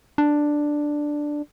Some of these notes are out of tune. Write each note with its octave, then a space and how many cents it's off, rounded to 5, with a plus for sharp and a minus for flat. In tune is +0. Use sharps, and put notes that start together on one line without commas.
D4 +5